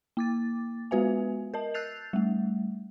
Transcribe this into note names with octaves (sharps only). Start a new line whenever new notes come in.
A#3 D6 A6
G#3 B3 F#4 B4 E5 G#5
A#4 D#5 A5
E6 F#6 G6 A6 C7 F7
G3 A3